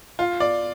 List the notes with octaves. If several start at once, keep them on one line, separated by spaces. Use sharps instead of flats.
F4
D5